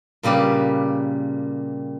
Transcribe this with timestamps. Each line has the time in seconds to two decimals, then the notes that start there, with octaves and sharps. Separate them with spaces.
0.23 A#2 C#3 G3 G4 B4